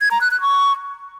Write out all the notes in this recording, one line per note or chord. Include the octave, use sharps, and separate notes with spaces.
G#6
A#5
F#6
F#6
C#6